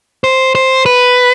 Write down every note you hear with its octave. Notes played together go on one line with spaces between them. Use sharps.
C5
C5
B4